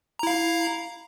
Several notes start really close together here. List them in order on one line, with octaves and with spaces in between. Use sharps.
A#5 E4 F5